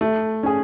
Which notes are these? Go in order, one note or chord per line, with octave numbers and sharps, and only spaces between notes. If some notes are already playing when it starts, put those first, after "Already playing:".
A3
C#4 G#4